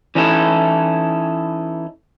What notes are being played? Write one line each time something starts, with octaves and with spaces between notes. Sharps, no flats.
E3 C#4 D#4 E4 A4